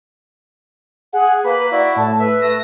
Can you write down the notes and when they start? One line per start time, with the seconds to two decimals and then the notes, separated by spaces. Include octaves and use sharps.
1.13 G#4 F#5
1.45 A#3 B4 B5
1.72 E4 F#4 D5
1.97 A2 A5
2.19 B4 E5
2.41 A3 E6 A#6